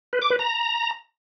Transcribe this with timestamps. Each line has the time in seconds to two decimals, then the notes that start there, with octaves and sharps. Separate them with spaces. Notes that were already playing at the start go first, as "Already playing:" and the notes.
0.13 B4
0.22 D6
0.30 B4
0.39 A#5